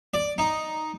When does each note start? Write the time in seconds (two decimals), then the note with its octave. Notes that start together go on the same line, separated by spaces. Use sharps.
0.14 D5
0.38 D#4